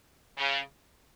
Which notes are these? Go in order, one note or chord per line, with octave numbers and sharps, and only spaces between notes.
C#3